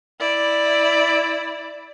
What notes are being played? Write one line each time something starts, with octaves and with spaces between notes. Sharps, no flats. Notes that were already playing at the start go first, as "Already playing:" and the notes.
E4 D5